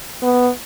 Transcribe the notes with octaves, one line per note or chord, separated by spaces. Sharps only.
B3